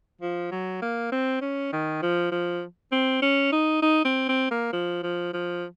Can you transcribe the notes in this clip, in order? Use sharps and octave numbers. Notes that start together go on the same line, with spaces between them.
F3
F#3
A#3
C4
C#4
D#3
F3
F3
C4
C#4
D#4
D#4
C4
C4
A#3
F3
F3
F3